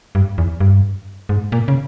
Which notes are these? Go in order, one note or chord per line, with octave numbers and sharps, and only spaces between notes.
G2
E2
G2
G#2
A#2
C#3